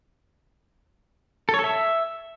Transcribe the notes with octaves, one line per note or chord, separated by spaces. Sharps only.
A4
C#5
A4
E5